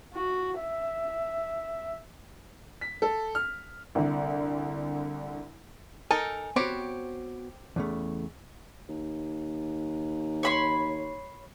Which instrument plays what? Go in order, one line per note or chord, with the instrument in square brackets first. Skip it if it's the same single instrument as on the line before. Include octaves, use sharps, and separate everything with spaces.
[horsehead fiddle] F#4
E5
[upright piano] B6
A4
F6
[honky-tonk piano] C2 D3
[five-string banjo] D#4 A4 A#4 [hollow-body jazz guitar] G#5
[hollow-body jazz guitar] B3 F#4 [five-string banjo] C4 G4 C#5
[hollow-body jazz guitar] E2 C#3 A3
[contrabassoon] D#2
[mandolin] C#5 B5 C6